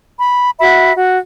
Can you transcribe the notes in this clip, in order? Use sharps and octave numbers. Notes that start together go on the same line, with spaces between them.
B5
F#4 E5 B5
F#4